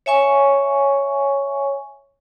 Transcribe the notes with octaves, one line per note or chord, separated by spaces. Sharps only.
C#5 E5 G#5 C#6